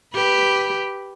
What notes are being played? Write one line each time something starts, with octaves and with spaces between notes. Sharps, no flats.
G4 B4